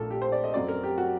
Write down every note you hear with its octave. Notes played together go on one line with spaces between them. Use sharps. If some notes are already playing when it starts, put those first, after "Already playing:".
Already playing: A#1 A#2 A3 A4 A#4
G4
C5
D5
D#5
F#2 F#3 C4 D5
A#4
G4
F#4